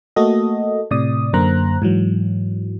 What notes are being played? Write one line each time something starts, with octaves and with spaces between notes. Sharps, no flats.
A3 A#3 F#4 A4 D#5
A2 C3 D5 D#6
F#2 D3 A#3 C5 A#5 F#6
G#2 E3 F#3